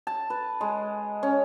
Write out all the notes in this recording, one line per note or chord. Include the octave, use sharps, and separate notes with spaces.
A5
B4
G#3
C#4